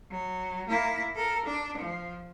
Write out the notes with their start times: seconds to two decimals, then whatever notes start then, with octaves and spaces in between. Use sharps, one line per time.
0.11 F#3
0.68 A#3 E4
1.15 A4 A#4
1.46 D4
1.77 F3